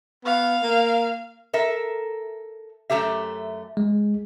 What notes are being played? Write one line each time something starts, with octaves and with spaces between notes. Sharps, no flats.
B3 F5
A#3
A4 A#4 E5
F#2 G3 A3 G4 E5
G#3